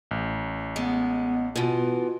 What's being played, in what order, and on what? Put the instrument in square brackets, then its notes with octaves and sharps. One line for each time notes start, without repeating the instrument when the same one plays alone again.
[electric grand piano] A1
[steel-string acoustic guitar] G#3 [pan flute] B3
[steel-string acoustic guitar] B2 E3 [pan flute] F4